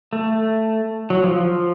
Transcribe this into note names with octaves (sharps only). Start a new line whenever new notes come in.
A3
F#3
F3
F3